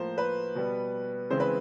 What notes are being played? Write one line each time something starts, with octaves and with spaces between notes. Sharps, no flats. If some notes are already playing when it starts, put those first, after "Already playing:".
Already playing: A2 F3 A#3 C5
B4
B2 G3 B3
C#3 E3 G#3 C4 C5
B4